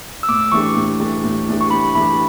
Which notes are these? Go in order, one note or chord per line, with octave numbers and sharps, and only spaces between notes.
E6
A2 D6
E3 A3 D4 G4 C#6
A2
E3 A3 D4 G4
A2
E3 A3 D4 G4
C#6
A2 B5
E3 A3 D4 G4 B5